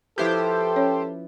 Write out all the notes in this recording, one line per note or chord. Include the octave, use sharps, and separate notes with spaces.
F3 E4 G4 A4 B4 C5
C#4 C#5